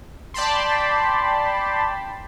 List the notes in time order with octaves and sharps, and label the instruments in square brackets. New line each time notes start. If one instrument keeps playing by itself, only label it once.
[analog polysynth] D5 G5 A5 B5 C6